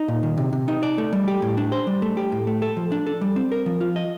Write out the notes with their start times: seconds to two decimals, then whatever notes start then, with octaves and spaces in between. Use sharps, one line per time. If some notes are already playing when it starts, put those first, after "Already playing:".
Already playing: D#4
0.08 A#2
0.23 D#3
0.37 C3
0.53 C3
0.68 D#4
0.83 D5
0.98 A3
1.13 G3
1.28 G4
1.42 A2
1.57 D4
1.72 C5
1.87 G3
2.02 A3
2.17 G4
2.32 A2
2.47 A3
2.62 A4
2.77 F3
2.92 D4
3.07 A4
3.21 G3
3.36 C4
3.52 A#4
3.66 F3
3.81 F4
3.96 D#5